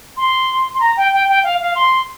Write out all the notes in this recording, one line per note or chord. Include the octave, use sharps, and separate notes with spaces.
C6
C6
A#5
G5
G5
G5
F5
F5
C6